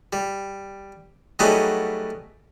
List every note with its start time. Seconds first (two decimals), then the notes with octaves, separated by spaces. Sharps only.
0.13 G3
1.39 F#3 G3 A3 B3 D#4 G#4